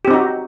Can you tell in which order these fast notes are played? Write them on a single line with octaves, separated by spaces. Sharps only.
G4 C4 D#4 F#4